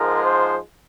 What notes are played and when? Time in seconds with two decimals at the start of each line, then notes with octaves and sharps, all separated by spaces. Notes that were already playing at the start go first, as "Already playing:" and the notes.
Already playing: G#2 F3 G#3 A#4
0.25 C5